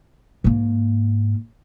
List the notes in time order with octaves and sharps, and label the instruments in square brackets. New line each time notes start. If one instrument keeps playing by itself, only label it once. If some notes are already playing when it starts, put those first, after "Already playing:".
[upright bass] G#2 A#3